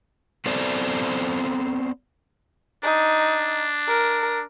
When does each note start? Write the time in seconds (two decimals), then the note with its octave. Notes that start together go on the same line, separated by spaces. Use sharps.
0.46 B3 C4 A4 C5 D5
2.84 D4 D#4
3.88 A#4